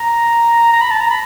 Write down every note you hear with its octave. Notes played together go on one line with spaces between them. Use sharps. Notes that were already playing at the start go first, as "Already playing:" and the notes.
Already playing: A#5
A#5
B5
A5
A#5
B5